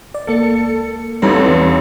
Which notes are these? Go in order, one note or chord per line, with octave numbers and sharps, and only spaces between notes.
D5
C#2 A#3 A4 C#7
A1 F2 G3 D#4 A4 B4
E2